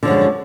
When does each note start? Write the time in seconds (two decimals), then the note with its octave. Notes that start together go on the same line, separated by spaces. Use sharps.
0.03 D3
0.05 F3
0.08 F#2
0.10 G#3